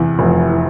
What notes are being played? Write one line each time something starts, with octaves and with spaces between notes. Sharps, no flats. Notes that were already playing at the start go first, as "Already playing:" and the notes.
Already playing: E2 C3 E4
F1
E3